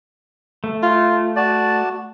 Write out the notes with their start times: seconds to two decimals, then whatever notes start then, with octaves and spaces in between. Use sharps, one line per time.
0.64 A3
0.83 F4
1.37 F#4 D5 A5